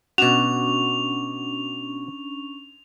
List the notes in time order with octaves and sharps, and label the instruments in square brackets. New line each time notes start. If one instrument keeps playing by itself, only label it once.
[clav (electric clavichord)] B2 F#4 [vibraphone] C#4 D4 C#6 [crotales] F7